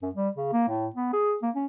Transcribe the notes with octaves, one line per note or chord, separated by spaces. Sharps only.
F#2
G3
C#3
A#3
A2
B3
G#4
A#3
C#4